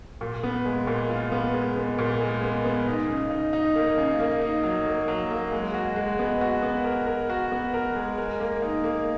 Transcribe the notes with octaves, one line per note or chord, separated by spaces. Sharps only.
A#2
B3
G#3
A#2
F4
B3
G#3
B3
A#2
G#3
B3
B3
D#4
C#3
D#4
D#4
A#3
C#3
A#3
D#4
F#3
A#3
F#3
A#3
G#3
F#4
G#3
B3
F#4
B3
A#4
A#4
F#4
B3
A#4
G#3
A#4
A#3
D#4
A#3